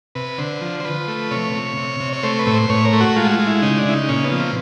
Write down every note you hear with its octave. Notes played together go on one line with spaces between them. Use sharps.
C3 B4
D3 C5
F3
C5
F3 B4
A3
C3 C#5
C3
C3
C3
C#5
A3 C5
B4
A2
C5
A2 C#5
A#4
A3
F#4
G#3 F4
F#4
F4
G#3
E4
C#3 D#4
D4
C#3 E4
D#4
A#2 C#4
B3
F3
C4